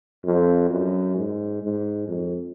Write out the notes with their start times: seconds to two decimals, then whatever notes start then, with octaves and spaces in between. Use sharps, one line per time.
0.25 F2
0.70 F#2
1.16 G#2
1.62 G#2
2.08 F2